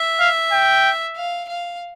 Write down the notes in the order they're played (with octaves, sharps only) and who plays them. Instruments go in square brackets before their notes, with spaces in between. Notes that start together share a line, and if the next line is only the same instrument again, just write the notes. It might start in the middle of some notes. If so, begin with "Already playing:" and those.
Already playing: [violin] E5
[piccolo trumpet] F5
G5
[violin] F5
F5